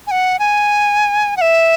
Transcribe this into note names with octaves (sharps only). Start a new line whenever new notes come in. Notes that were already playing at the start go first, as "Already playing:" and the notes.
G#5
F#5
G#5
F#5
E5